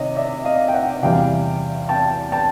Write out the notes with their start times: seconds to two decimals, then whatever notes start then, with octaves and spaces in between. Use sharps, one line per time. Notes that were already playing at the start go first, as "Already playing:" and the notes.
Already playing: C3 D#3 C#5 D#5
0.16 D5 E5
0.44 D#5 F5
0.68 G5
0.74 E5 F#5
1.02 E2 C3 E3 G3 F5 G5
1.89 G5 A5
2.32 G5 A5